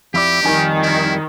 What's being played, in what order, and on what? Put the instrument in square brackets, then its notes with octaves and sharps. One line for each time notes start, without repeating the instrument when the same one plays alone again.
[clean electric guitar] F2 E4 D5 [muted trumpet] G4
[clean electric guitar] F2 G3 G#5 [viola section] D#3
[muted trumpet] E4